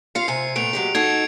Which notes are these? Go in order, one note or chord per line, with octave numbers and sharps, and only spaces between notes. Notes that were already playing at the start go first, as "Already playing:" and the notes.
F4 F5 C7 C#7
C3 G#5
A#2 A3 B3 D7 F7
F#3 G#3 G4
D#4 F#4 A4 G#6 C7 D7